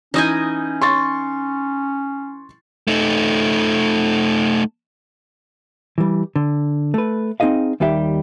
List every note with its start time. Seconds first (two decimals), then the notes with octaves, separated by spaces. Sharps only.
0.14 E3 C#4 D#4 D#5 G#5 D#6 G6
0.82 C6 C#6 A6
2.88 A3 D#4
5.98 E3 G3
6.36 D3
6.94 A3 B4
7.40 C4 D#4 G#4 D#5 F5
7.80 D#2 D#3 G3 G4 E5